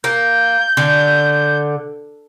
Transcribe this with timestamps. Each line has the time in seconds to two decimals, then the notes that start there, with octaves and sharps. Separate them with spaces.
0.04 A#3 G6
0.77 D3